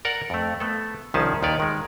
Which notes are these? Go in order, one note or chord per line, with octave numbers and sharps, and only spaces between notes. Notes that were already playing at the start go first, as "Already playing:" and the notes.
A#4 D5 F#5
F2 A3
A3 B3 A4
C2 D#3 F3 C#4 G#4 A5
D#2 D#3 B4 C#5 D5
D#3 G#3